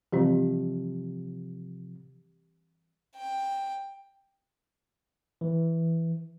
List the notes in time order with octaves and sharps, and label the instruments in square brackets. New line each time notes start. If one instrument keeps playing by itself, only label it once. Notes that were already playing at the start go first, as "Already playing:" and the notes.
[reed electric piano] C3 F3 [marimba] E3 G3 C4 [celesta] G4
[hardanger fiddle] G5
[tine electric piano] E3